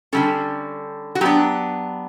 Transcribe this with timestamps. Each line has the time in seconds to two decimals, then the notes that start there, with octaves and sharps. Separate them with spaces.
0.13 D3 G3 C#4 A4
1.15 F#4
1.21 F#3 B3 D4 G4